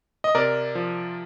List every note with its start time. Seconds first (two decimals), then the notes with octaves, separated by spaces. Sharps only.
0.24 D#5
0.35 C3 A#4 D5
0.75 F3